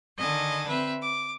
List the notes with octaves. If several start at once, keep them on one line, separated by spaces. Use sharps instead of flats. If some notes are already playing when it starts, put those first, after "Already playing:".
D3 D#3 D#5 G#5 A5
C4 B4 E5
D6